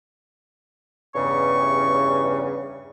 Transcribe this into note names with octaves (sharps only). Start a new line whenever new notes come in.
E2 G2 C#3 C#6